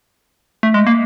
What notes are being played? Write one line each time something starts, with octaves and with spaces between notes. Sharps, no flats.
A3
G#3
A#3